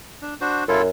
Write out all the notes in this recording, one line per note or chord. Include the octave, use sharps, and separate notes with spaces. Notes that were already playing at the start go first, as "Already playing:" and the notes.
D4
D4 F#4 C5
F#2 E4 F4 A4